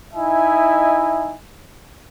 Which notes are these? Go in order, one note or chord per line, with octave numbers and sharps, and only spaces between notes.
D#4 E4 D#5 E5 G#5